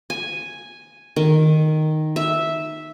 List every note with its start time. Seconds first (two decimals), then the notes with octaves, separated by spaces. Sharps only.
0.10 G#5
1.16 D#3
2.16 E5